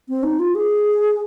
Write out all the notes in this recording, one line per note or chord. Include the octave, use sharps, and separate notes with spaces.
C4
D#4
F4
G#4